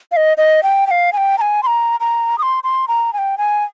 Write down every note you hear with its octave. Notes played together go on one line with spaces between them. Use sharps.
F5
D#5
D#5
G5
G5
F5
G#5
G5
A#5
G#5
C6
A#5
A#5
D#6
C6
C6
A#5
G#5
G5
G#5